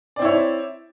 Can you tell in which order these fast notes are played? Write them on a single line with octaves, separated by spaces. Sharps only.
D5 C4 E4 C#5